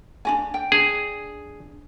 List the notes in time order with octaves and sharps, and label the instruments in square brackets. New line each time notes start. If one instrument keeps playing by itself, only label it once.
[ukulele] D4 F#4 G#5
G5
[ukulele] D4 [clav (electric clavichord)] G#4